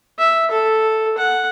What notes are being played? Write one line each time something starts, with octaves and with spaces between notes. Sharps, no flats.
E5
A4
F#5